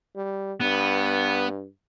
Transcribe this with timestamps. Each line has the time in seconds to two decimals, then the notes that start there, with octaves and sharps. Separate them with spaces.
0.16 G3
0.61 G2 B3